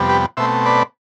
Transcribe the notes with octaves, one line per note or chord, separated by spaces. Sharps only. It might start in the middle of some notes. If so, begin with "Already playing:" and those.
Already playing: F2 C3 G3 B3
G4 B4
B2 A3 C4 C5 E5
B4 D5